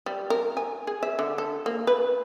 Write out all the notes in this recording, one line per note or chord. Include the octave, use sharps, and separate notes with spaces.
G3
A#4
G#5
G#4
E5
D3
A4
A#3
B4